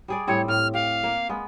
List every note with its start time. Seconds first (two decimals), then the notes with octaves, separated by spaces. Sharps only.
0.08 G3 G#4 D5
0.27 A2 G3 C4 C#5
0.48 A2 F6
0.74 G4 F5
1.03 A#3
1.29 G#3 B3